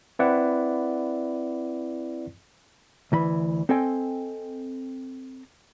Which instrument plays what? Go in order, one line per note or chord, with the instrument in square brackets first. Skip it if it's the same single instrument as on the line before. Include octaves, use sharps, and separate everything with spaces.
[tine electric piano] C4 E4 B4 D5 F#5
[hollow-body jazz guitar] D2 E3 B5
C4 A4 D#5 G5 G#5